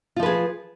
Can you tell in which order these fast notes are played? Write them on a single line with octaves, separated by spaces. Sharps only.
F4 F3 B4 G#4